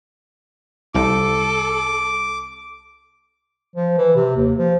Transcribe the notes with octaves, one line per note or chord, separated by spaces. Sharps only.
C2 A4 D6
F3
E3
C3
D#2
F3